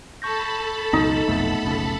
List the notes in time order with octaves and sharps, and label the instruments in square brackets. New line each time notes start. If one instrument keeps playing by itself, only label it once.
[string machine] A4 A5 B5 [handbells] C#6 G6 A#6
[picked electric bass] C#2 F#2 B2 [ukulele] D#4
[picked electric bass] F1 B1 F2 [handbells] A3 B3
[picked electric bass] F1 B1 C#3